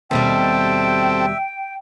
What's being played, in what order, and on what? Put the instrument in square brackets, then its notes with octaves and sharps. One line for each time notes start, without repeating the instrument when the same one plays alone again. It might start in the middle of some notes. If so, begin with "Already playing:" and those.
[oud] D#2 B2 G3 [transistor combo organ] C4 A4 [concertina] E5 [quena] G5